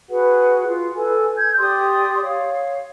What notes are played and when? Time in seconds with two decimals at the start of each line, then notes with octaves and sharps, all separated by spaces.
0.08 F#4 G#4 B4 F#5
0.67 F4
0.95 A4 B4 G#5
1.36 G6 G#6
1.58 G4 D5 C6 D#6
2.21 C#5 F5